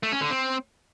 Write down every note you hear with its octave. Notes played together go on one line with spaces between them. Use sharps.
A3
C#4
D3
C4